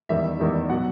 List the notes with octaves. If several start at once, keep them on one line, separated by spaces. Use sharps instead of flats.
E2 D#3 G3 E5
E2 D#3 G3
B2 F#3 F#5